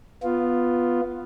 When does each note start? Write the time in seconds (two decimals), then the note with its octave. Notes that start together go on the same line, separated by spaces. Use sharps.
0.23 B3 F4